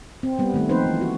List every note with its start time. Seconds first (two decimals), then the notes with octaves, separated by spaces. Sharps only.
0.23 C4
0.39 G3 B3
0.54 D#3 A3
0.69 F3 A#3 C4 D#4 B4 C5
0.86 E3
1.01 F#4